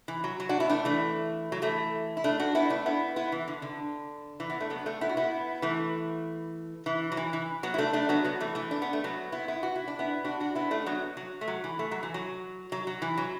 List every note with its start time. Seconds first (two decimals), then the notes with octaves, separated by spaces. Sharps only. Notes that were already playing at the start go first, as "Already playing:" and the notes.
0.08 E3
0.24 F#3
0.40 F#3
0.49 D4 F#4
0.60 B3 E4
0.70 A3 D4
0.85 E3 A3
1.52 F#3
1.62 E3 A3
2.17 E4
2.24 A3 D4
2.39 D4 F#4
2.55 B3 E4
2.70 A3 D4
2.86 B3 E4
3.16 B3 E4
3.32 E3
3.48 D3
3.62 D3
4.40 E3
4.50 B3 E4
4.60 A3 D4
4.70 F#3 B3
4.86 A3 D4
5.01 B3 E4
5.09 F#4
5.17 B3 E4
5.62 E3 A3
6.86 E3
7.12 F#3
7.17 E3
7.33 E3
7.63 F#3 B3
7.74 E4
7.78 A3 D4
7.93 A3 D4
8.09 F#3 B3
8.24 F#3 B3
8.40 E3 A3
8.55 E3 A3
8.71 D4
8.82 B3
8.93 A3
9.04 F#3 B3
9.32 B3 E4
9.48 B3 E4
9.63 F#4
9.75 E4
9.88 D4
9.99 B3 E4
10.24 D4 F#4
10.40 D4 F#4
10.55 B3 E4
10.71 A3 D4
10.82 D4
10.86 F#3 B3
11.17 F#3
11.41 A3
11.48 F#3
11.64 E3
11.79 A3
11.91 F#3
12.03 E3
12.14 F#3
12.72 F#3
12.87 F#3
13.02 E3
13.17 F#3